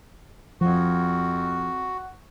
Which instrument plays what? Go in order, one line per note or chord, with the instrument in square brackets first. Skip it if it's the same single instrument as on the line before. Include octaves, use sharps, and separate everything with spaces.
[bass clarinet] F2 [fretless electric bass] F3 [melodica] F#4